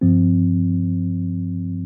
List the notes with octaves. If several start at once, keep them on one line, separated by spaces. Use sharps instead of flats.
G2 F3 C4